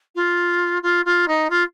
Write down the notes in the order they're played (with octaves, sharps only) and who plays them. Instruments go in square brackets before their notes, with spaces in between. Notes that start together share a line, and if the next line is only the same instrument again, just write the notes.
[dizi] F4
F4
F4
D#4
F4